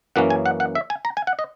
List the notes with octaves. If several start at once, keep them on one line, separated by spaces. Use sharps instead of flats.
F#2 E3 A#3 C#4 F#5
G#5
F#5
F#5
E5
G#5
A#5
G#5
F#5
D#5